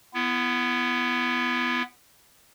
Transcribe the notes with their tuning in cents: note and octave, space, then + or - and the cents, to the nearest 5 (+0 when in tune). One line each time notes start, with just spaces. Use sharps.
B3 +0 E4 +35